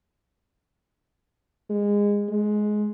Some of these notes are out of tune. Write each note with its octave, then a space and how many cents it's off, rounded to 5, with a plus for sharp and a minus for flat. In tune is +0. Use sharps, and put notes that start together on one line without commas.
G#3 -20
G#3 +15